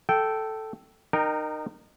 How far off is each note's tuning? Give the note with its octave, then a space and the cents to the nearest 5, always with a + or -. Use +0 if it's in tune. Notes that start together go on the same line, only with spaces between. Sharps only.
A4 +0 G5 -15
D#4 -25 A#4 +0 G5 -5